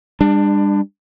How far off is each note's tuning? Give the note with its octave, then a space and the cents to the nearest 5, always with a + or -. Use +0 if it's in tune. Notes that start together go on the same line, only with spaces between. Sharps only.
G3 +40 D4 +15